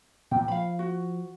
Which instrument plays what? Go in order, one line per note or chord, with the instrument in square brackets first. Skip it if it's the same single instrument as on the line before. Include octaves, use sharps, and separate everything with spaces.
[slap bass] D2 A#2 [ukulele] G5
[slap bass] F3 [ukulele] F5 B5
[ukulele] F#4